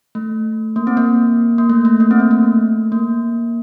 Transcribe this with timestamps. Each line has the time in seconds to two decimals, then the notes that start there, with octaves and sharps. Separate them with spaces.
0.15 A3
0.76 A#3
0.87 C4
0.97 A#3
1.58 A#3
1.70 A3
1.85 A3
2.00 A#3
2.11 C4
2.20 A#3
2.31 A3
2.92 A#3